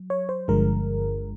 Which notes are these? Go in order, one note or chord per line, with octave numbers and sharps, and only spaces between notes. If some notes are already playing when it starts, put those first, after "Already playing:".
Already playing: F#3
C#5
C5
G1 G2 D3 F3 G#3 A#4